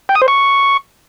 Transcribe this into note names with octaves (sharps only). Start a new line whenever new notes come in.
G5
D#6
C5
C#6